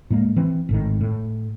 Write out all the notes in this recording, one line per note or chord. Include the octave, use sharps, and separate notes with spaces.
A2 G#3 A#3
E3 C4
G#1 A2 D#3
A2